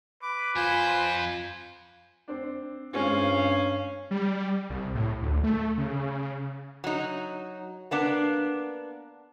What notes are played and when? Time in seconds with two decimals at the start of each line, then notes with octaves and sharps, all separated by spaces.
0.22 B4 D6
0.56 F2 F4 C5 G#5 G6
2.28 C4 D4
2.94 G2 G#3 C4 C#4 F4 F5
4.11 G3
4.70 C2
4.95 A2
5.22 D2
5.43 A3
5.78 C#3
6.84 F#3 D#4
7.91 A#3 B3 D4